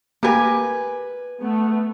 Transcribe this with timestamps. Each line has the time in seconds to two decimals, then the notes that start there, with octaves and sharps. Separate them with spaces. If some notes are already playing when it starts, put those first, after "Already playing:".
0.23 A#3 G4 A#4 B4 G#5
1.39 A3 B3